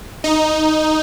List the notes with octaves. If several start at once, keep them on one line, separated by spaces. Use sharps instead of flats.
D#4